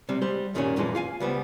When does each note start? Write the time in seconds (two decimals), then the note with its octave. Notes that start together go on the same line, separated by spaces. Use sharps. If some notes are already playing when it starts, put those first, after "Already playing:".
0.09 C3 G3
0.22 G3 G#3 C5
0.54 F#2 A#2 D#3 G3 C4 C#4
0.76 F2 A#2 E3 G#3 G#4 A5
0.95 F4 F5 G#5
1.20 C#2 G3 B3 C5